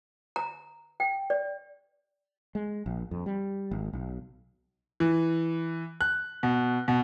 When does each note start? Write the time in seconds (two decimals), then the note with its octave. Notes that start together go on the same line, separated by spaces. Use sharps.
0.36 A#5
1.00 G5
1.30 D5
2.55 G#3
2.86 A#1
3.11 F2
3.26 G3
3.71 G#1
3.93 B1
5.00 E3
6.01 F#6
6.43 B2
6.88 B2